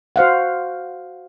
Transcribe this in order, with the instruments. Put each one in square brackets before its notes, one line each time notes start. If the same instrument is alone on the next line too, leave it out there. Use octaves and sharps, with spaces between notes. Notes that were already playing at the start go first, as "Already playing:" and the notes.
[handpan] F#4 C5 F5 F#5